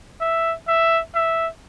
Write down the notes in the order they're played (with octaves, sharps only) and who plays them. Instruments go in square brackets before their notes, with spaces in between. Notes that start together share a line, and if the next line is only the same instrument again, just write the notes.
[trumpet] E5
E5
E5